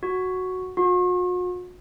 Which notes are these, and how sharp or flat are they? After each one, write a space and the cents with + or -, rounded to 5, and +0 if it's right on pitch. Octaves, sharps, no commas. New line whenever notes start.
F#4 +0
F#4 -45